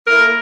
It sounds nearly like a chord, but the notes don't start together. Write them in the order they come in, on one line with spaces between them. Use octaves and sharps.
A#4 A#3 E4 A4